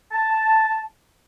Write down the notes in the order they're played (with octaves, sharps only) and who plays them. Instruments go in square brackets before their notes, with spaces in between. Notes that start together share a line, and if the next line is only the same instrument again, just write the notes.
[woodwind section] A5